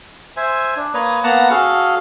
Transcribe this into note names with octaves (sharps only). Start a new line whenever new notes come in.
C5 E5 G#5
D4
A#3 B4 C#5 A#5 D#6
A#3 B3 F#5 A5 A#5
C#4 F#4 G#4 A4 F5